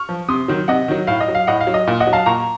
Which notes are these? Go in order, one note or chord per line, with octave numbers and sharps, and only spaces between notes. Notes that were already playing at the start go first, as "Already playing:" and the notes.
Already playing: C#6 F6
F3
C3 C6 D#6
D#3 F#3
C3 D#5 F#5
D#3 F#3
A2 F5
D#5
F#3
F5
A2 D#5 F#5
F5
F#3
D#5
A#2
D#5 F#5
F#3
F5 A5
A#2 A#5 C#6